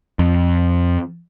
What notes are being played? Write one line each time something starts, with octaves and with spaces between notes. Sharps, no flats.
F2